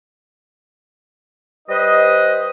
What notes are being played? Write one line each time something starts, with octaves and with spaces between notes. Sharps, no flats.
G3 B4 C5 D#5